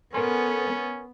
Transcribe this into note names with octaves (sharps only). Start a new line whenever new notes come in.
B3 C#4 A4 A#4 G#5 C6